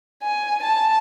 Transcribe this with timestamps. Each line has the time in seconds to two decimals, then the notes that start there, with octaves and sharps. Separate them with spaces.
0.23 G#5
0.63 A5